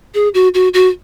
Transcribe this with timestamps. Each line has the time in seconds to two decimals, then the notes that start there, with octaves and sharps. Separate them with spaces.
0.14 G#4
0.34 F#4
0.54 F#4
0.74 F#4